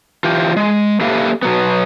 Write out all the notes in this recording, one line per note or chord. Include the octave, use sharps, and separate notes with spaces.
E3 F4 G4
G#3
A#3 G4 A4 B4 E5 F5
B2 F#3 B3